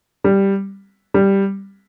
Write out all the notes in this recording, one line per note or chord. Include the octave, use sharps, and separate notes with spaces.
G3
G3